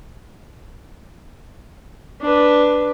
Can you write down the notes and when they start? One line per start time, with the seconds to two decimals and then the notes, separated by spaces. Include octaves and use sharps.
2.21 D4 B4